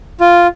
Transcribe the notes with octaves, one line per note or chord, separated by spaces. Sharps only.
F4